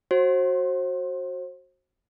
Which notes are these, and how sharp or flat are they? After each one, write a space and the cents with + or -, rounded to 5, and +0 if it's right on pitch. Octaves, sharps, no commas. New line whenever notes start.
F#4 +0 C5 +30